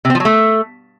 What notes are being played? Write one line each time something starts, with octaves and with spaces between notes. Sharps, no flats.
C3
C4
F3
F#3
A3